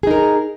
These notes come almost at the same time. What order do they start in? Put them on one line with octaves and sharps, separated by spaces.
G#4 D#4 A#4